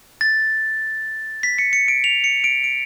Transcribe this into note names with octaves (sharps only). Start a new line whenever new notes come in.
A6
B6
C#7
C#7
D7
F7
C#7
D7
D7